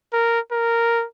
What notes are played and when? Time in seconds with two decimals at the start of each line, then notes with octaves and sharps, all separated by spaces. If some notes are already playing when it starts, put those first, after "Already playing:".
0.13 A#4
0.52 A#4